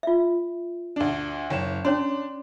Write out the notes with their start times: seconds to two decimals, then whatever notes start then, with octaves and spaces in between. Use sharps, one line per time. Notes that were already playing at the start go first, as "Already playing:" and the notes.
0.03 F4 E5
0.96 D2 D4
1.50 F#1 C#5 G5 E7
1.85 C#4 D4 C#5 C6